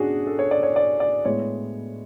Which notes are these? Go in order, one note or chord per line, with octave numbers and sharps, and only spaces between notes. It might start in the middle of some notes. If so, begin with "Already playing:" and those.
Already playing: G#2 B3 C#4 D4 F#4 G#4
A4
C#5
D5
C#5
D5
D5
A2 G#3 B3 C#5